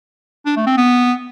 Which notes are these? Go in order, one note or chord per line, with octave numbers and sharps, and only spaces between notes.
D4
A3
C4
B3